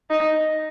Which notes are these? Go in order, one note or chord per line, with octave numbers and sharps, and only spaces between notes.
D#4